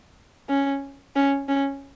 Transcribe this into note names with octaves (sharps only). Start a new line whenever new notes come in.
C#4
C#4
C#4